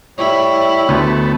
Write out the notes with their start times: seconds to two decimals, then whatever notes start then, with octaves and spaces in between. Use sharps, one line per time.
0.18 A2 G3 E4 C#5
0.89 D2 A3 B3